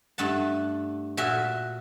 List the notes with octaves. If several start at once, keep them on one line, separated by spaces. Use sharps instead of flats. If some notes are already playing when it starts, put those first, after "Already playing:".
G2 A3 F#5 A5
A#2 F#4 A4 E5